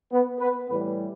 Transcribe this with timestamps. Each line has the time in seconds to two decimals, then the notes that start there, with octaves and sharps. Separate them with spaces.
0.11 B3 B4
0.40 B3 B4
0.68 A2 E3 G3 B3 B4